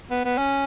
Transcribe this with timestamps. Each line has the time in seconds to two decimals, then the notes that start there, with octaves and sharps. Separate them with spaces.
0.10 B3
0.25 B3
0.38 C#4